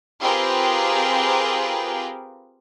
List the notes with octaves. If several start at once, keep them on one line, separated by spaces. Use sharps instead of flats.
C4 F4 G4 G#4 A#4 B4